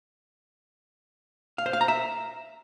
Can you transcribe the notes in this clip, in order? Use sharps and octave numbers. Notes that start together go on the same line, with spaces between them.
F5
C5
F5
A#5
E5